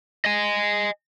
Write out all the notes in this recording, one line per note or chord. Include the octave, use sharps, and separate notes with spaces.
D#5 G#5